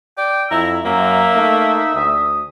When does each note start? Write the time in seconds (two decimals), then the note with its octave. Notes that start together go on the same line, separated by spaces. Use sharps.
0.18 D5 G5
0.51 F2 E4 A#5 E6
0.85 F#2 A#3 E5 A#5
1.35 A3 D#4
1.94 D2 D#6